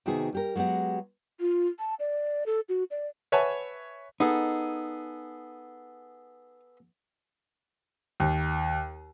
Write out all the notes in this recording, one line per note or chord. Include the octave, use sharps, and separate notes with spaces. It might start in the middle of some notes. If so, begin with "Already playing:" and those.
C3 D#3 B3 F#4 G#4
G3 G4 A#4
F#3 G#3 B3 G4 F#5
F4
A5
D5
A4
F#4
D5
B4 C#5 E5 F#5 G#5 A5
B3 D#4 G#4 A4
D#2